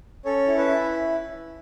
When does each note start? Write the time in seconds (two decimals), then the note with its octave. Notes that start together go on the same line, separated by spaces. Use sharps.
0.25 C#4 A4 C#5
0.47 E4
0.58 B4 E5
0.68 E4